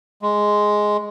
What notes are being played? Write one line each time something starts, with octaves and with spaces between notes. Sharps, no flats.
G#3